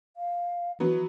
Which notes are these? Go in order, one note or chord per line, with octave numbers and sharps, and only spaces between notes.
F5
E3 F#3 B3